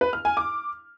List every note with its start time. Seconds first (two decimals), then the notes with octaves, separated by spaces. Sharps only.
0.01 B4
0.13 F6
0.25 G#5
0.37 D6